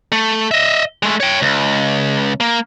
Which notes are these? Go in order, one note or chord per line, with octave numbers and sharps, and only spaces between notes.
A3
D#5 E5
G#3 A3
C#5 G5
C#2
A#3